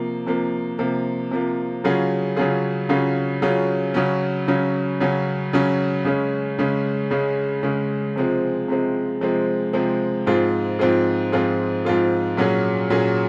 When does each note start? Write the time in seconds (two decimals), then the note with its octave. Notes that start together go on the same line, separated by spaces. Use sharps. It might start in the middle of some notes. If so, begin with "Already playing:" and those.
Already playing: C3 F3 A#3
0.27 C3 F3 A#3
0.79 C3 F3 A#3
1.31 C3 F3 A#3
1.84 C#3 F#3 C#4 F4 G#4
2.36 C#3 F#3 C#4 F4 G#4
2.89 C#3 F#3 C#4 F4 G#4
3.42 C#3 F#3 C#4 F4 G#4
3.94 C#3 F#3 C#4
4.48 C#3 F#3 C#4
5.00 C#3 F#3 C#4
5.53 C#3 F#3 C#4
6.05 C#3 G#3 C#4
6.59 C#3 G#3 C#4
7.11 C#3 G#3 C#4
7.63 C#3 G#3 C#4
8.16 C3 F3 G#3 C4
8.68 C3 F3 G#3 C4
9.21 C3 F3 G#3 C4
9.73 C3 F3 G#3 C4
10.27 G#2 F3 C4 F4 G#4
10.79 G#2 F3 C4 F4 G#4
11.32 G#2 F3 C4 F4 G#4
11.85 G#2 F3 C4 F4 G#4
12.37 A#2 F#3 C#4 G#4
12.90 A#2 F#3 C#4 G#4